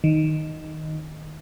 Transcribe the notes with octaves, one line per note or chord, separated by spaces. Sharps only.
D#3